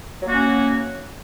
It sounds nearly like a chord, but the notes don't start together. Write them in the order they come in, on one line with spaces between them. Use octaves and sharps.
F#3 A#3 F#4 C#4